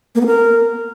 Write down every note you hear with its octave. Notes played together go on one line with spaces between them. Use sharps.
A#3
B3
A#4